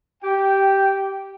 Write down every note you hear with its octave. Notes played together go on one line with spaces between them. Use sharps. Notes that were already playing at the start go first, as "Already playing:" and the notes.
G4 G5